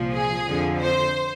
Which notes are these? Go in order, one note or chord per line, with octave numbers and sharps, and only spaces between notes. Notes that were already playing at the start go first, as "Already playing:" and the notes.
Already playing: C2 A#2 F3
G#4
F2 D3 F3
C5